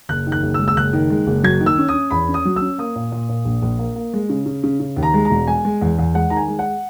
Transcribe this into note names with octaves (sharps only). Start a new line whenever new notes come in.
F#1 F#6
D#3
F#6
F#1
E6
G#3
E6
F#1 F#6
D#3
G#3
F#1
F#3 G#6
D#3
E6
C#4
D#6
C#4
E2 B5
C#4
D#6
F#3
E6
C#4
A#3 D#6
A#2
A#2
A#2
A#1
A#1
A#3
A#3
G#3
C#3
C#3
C#3
C#3
D#2
A#5
G#3
A#5
E1
G#3 G#5
G#3
E2
E2
G#3 F#5
D#3 A#5
G#5
G#3
F#5